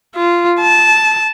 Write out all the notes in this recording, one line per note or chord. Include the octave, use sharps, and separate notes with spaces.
F4
A5